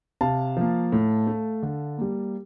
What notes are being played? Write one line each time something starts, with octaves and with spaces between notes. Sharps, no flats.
C3 F5 A5
F3 A#3
A2
A3
D3
G3 A#3